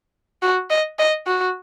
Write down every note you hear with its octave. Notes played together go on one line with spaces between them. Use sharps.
F#4
D#5
D#5
F#4